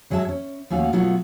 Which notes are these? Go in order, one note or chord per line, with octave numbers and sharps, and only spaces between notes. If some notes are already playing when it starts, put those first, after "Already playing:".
F#2 F#3 G#3 B3 E5 A5
C#4
D#2 A3 C#4 F#4 F5 F#5
B2 F#3 A3 B3 F4 F#4